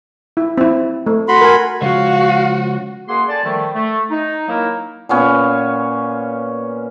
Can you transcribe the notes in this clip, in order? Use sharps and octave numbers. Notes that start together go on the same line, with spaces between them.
E4
C4 E4
A3
F#4 B5 C6
A#4 G#5
C#3 F3 G#3 F#4 F5
F#2 A#3 G#4 F#5 C6
A4 D5 G#5 A5
D3 D#3 F3 G3 A3
A3
D#4
D#3 F#3 A#3 D#4 E4 A#4
A#2 B3 C#4 F5